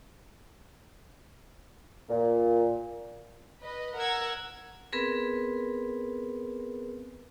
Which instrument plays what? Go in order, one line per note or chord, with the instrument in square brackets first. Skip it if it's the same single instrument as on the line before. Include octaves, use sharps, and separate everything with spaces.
[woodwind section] A#2
[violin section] B4 D#5
A#4 F#5 E6 G#6
[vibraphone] B3 C4 G#4 A#4 B4